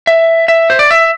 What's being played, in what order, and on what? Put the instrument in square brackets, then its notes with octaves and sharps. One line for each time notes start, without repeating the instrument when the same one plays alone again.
[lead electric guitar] E5
E5
C5
D5
E5